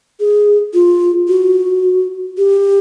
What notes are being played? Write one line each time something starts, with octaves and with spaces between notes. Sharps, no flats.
G#4
F4
F#4
G4